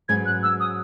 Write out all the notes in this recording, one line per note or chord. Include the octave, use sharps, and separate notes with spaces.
G#2 F#3 C#4 G#4 B4 G#6
F#6
E6
D#6